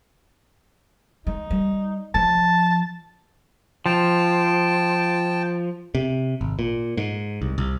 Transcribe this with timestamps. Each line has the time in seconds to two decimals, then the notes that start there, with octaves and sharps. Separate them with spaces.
1.27 G#3 D#4
1.51 G3
2.15 F3 A5
3.86 F3 G5 A5
5.95 C3
6.41 G#1
6.59 A#2
6.97 G#2
7.42 C2
7.58 C2